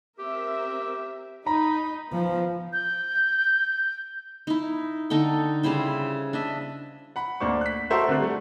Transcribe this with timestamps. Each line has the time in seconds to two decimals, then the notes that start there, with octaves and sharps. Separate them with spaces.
0.19 C4 G4 A#4 E5
1.47 D#4 A#5 B5
2.12 F3 B3
2.73 G6
4.47 D#4 E4
5.10 D3 D#4 A4 G5
5.63 C#3 G3 E4 C5
6.33 D4 D#5 E5
7.16 F#5 B5
7.40 D2 A#3 D4 C5 C#6
7.61 F#6 B6
7.90 A3 F#4 A4 A#4 C5 E5
8.08 D3 C4 D4 A#4 F#6
8.19 G3 A3